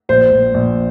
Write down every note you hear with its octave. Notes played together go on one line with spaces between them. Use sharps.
A#1 C5
A#1
A#1